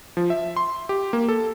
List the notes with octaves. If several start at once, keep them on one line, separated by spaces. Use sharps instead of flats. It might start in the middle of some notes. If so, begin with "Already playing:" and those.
F3
E5
C6
G4
A#3
A4